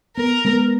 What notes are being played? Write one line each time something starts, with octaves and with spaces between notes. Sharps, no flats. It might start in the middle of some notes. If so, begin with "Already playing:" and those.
B3 A#4
G#3 B3